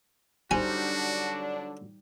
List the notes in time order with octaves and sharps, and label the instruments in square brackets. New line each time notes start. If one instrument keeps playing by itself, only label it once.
[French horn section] D3 F#3 D4 [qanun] G3 D#4 C5 [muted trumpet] F#4 [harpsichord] G#5